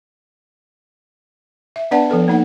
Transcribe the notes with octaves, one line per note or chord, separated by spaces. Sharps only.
E5
B3 D4 B4 D5 F#5 A5
F3 B3 A4 B4
A#3 D#4 F#5